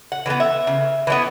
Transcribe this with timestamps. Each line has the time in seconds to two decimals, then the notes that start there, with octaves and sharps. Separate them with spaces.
0.12 F#5
0.26 E3 G#3
0.30 B3
0.40 E5
0.67 C#3
1.07 E3 G#3 B3